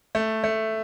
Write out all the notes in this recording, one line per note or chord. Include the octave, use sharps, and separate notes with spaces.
A3
A3